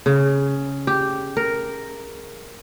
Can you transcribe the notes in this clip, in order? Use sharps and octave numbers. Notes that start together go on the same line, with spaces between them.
C#3
G4
A#4